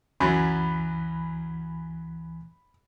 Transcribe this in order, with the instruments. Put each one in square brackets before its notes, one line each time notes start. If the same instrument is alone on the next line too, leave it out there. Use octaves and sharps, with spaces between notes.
[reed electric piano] C#2 E3 [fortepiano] F#2 F#3 C#4 [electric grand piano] B5